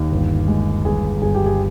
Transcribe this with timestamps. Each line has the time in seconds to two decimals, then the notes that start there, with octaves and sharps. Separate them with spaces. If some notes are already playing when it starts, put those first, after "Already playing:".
Already playing: D#2
0.12 G1
0.48 G#3
0.85 G1 G#4
1.22 G1 G#4
1.35 G4
1.46 G#4